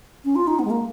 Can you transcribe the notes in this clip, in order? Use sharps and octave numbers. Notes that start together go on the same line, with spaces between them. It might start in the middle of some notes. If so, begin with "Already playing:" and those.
C#4
F4
D#4
B3
G#3
A#3